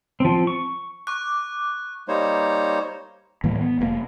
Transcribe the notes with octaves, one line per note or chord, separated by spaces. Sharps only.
F3 C4
C#6
C#6 D6 F#6
G3 A#3 D#4 C5 C#5
A2 E3 G3 A#3
B3
F1 A2 A#3